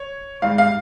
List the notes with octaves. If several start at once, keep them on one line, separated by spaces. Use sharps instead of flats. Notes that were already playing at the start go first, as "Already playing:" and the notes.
Already playing: C#5
G#2 G3 F5
F5